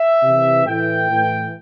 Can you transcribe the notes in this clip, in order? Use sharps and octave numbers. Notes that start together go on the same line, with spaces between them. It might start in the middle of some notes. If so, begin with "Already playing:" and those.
Already playing: E5
C3 E3
A2 E3 G5
A2 E3